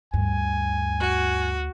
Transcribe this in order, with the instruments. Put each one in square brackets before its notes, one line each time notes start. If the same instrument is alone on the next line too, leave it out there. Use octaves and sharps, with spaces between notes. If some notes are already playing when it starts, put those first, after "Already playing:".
[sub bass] D2 [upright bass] G2 [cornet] G#5
[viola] F#4